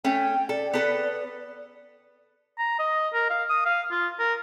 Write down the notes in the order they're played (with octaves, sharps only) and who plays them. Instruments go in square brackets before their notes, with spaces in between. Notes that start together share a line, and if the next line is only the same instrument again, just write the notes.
[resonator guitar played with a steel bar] A3 C#4 [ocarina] G5
[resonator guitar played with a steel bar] A4 [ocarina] D5
[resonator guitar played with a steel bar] B3 A4 B4
[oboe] A#5
D#5
A#4
F5
D#6
F5
F4
A#4